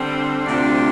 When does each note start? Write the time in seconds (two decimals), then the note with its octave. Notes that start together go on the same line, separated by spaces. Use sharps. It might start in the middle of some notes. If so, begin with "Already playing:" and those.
Already playing: D3 G3 C4
0.47 D2 C3 G3 D4 F4